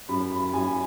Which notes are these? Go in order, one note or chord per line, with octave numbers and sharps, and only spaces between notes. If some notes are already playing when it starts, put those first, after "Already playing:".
F#2 B5
B5
F#2 G#5